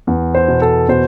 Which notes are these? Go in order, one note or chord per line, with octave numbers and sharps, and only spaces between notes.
E2
C5
B2
A4
B2 C5